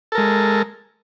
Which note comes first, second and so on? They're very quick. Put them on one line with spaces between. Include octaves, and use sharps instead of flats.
A4 A#4 G#3